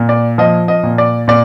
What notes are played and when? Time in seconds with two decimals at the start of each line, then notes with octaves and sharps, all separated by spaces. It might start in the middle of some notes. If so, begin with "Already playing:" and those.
Already playing: A#2
0.09 D5
0.38 F3 D#5
0.68 D#5
0.84 A#2
0.98 D5
1.28 A#2 D5